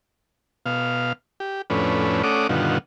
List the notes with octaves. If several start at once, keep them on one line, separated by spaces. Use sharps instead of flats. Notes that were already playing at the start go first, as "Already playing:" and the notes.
B2 F5
G4
F2 A2 C#4 D4 B4
A3 C#4 D5 F#5 D6 D#6
G2 B2 D3 D#3 F4 F#5